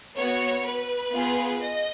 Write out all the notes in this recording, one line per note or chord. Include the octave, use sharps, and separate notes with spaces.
B3 F#4 C#5
B4
B3 F4 G#4
D#5